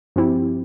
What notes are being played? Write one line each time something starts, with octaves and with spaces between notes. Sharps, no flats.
G2 F3 C4 E4 G4